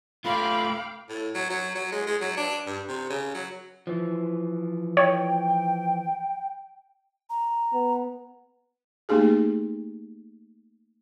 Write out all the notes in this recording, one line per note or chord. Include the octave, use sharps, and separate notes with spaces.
A3 F4 F5 G5 B5 D6
A2
F#3
F#3
F#3
G#3
G#3
F#3
D4
G2
C3
C#3
F#3
E3 F3
C#5 G5
A#5
B3
A3 A#3 D#4 G4 G#4